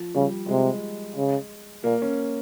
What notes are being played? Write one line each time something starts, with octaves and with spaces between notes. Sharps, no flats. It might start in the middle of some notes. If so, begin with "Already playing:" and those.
Already playing: F3
C#3 G3
C3 G#3
C#3
A#2 A#3
C#4